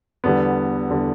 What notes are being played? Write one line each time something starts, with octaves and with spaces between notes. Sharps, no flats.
E2 D3 G3 B3
E2 D3 G3